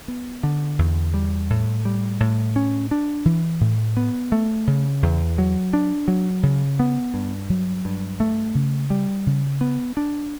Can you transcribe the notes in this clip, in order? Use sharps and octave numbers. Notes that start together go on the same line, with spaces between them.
B3
D3
E2
G3
A2
G3
A2
C#4
D4
E3
A2
B3
A3
C#3
E2
F#3
D4
F#3
C#3
B3
G2
F#3
G2
A3
C#3
G3
C#3
B3
D4